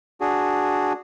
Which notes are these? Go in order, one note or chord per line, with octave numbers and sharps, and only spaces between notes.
D4 F#4 G#4